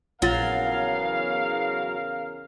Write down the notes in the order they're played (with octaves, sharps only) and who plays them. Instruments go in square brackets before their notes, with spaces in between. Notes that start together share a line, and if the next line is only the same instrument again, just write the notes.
[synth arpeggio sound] A#1 F4 A6 [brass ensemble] E2 C#3 A#4 [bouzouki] F#3 [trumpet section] F5